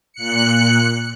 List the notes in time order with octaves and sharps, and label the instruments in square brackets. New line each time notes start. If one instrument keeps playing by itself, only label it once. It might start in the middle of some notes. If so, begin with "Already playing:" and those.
[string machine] A#2 F#6 C#7